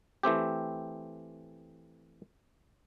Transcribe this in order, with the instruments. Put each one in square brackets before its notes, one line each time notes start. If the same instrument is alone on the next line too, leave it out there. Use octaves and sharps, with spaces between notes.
[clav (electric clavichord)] E3 A3 C4 G4